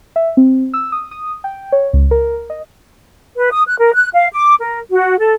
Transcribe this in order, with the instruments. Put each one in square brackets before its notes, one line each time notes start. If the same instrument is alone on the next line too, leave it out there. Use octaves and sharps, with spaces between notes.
[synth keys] E5
C4
E6
D#6
D#6
G5
C#5
C#2
A#4
D#5
[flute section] B4
D#6
F#6
A#4
F#6
F5
D6
A#4
F#4
A4